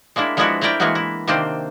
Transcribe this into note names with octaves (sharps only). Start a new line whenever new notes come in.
G#3 A#3 D4 E4
F3 G#3 B3 D4 E4 F#4
A3 E4 A#4 D5 G5
E3 G#3 A#3 B3 F#4
E4
C3 D#3 A#3 C4 D4 C5